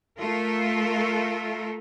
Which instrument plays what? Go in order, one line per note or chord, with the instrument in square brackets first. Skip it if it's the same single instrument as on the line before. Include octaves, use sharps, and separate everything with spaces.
[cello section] A3 F4 A4 A#4